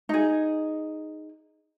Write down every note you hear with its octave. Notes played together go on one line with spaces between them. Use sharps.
D#4 G#4